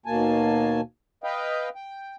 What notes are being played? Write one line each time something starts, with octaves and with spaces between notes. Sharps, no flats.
D#2 B2 A#3 G#5 A5
B4 D#5 F5 G5
G5